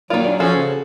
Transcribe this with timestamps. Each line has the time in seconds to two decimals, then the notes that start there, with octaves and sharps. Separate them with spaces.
0.10 D#3 F#3 A#3 F4 A#4 D5
0.24 D4 G#4 D5
0.40 F3 C#4 F#4 G#4 A4 C5
0.55 C#3